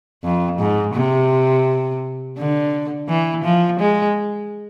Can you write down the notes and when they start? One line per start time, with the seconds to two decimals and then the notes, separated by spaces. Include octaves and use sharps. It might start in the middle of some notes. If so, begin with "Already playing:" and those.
0.24 F2
0.59 G#2
0.94 C3
2.38 D3
3.09 E3
3.44 F3
3.80 G#3